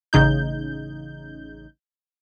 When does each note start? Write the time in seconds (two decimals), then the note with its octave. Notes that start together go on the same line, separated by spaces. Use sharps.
0.13 A1 C#3 D#4 G6